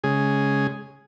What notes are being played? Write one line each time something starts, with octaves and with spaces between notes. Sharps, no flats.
C#3 G#3 G#4